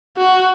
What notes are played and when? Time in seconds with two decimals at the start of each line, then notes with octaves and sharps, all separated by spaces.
0.17 F#4